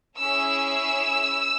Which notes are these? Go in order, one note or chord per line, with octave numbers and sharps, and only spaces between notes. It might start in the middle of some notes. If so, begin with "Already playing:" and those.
C#4 E4 G#4 E6